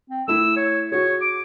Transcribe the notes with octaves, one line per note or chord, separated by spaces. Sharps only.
C4
A3 E4 E6
C#5
F#4 G#4 C#5
D6